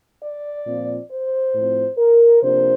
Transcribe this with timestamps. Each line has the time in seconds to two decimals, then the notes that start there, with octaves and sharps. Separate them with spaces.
0.23 D5
0.67 A#2 F3 C4
1.11 C5
1.55 A2 F3 C4
1.98 A#4
2.42 C3 F3 A#3 D4 C5